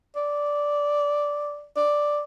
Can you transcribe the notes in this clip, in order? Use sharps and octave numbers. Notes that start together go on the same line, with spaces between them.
D5
D5